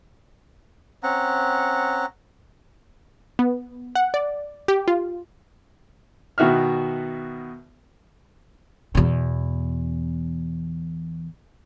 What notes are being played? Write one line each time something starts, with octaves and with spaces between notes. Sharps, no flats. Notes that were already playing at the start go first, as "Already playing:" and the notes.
C4 C#4 F#5 A#5
B3
F#5
D5
G4
F4
B2 D#3 F#4 E5 F6
E2 B2